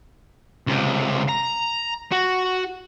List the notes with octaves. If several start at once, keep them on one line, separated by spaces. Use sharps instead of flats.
C#2 C3
A#5
F#4